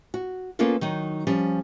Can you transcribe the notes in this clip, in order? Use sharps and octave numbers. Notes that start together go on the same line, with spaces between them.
F#4
A#3 B3 C#4 F4 A4 A#4
D#3 F#3 D#4
F3 G3 C#4